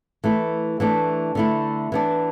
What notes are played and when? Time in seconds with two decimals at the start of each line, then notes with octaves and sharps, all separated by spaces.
0.24 E3 A3 E4
0.80 E3 A3 D4
1.35 D3 A3 E4
1.92 E3 B3 D4